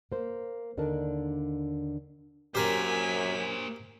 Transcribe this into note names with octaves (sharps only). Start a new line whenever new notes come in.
A#3 C5
D#2 D3 D4 D#4 A#4 A5
F#2 A#3 G4 A#4 C5 G#5 B6